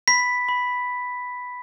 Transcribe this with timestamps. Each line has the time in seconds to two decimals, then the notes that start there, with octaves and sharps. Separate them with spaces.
0.08 B5 B6
0.49 B5